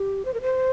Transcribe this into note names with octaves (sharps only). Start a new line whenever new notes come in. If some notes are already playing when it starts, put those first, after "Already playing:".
Already playing: G4
C5
A#4
C5